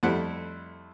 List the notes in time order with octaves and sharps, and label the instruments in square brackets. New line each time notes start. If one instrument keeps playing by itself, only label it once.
[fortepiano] F2 G3 A3 E4 C5 F#5